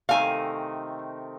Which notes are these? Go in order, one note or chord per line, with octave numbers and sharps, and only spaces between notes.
C3 D#3 A3 F5 G#5